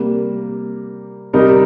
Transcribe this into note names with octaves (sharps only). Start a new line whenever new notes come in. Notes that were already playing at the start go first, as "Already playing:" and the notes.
Already playing: C3 G3 A#3
C3 G3 D#4 A#4